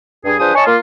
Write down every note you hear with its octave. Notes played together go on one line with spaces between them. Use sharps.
G2 G#4
F3 D4 G#4 B4 C5 D#6
C#5 D#5 G#5 A5 C#6
A#3 F4